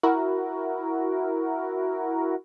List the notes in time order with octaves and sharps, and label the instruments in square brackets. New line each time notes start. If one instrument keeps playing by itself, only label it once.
[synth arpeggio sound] E4 F#4 A#4